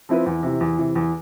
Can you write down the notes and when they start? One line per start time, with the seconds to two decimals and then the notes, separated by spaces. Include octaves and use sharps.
0.09 F3 C4 E4 B4
0.26 E2
0.43 C3 E3
0.61 E2
0.78 C3 E3
0.95 E2